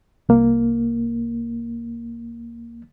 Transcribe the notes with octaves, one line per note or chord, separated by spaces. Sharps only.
C2 A#3